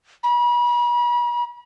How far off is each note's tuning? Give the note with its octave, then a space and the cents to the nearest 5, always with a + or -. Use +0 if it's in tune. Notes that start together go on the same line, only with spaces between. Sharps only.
B5 -40